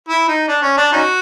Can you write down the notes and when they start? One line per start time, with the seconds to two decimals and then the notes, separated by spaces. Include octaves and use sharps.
0.09 E4
0.28 D#4
0.48 D4
0.62 C#4
0.77 D4
0.93 C#4 D#4 F#4